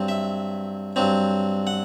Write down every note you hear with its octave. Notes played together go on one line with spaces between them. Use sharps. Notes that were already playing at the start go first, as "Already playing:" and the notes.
Already playing: G2 F#3 C4
E5
G2 F#3 C4
F#5